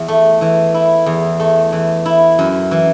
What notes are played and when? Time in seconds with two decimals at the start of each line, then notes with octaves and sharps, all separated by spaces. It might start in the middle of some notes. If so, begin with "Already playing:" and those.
Already playing: E2
0.08 A3
0.41 E3
0.74 E4
1.06 E2
1.40 A3
1.72 E3
2.06 E4
2.39 F#2
2.71 E3